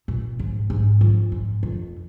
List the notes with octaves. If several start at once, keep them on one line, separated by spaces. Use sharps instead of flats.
A#2
G#2
G#2
F2
G#2
F2